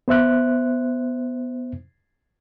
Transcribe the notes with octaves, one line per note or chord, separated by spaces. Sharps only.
B3 C5 E5 F#6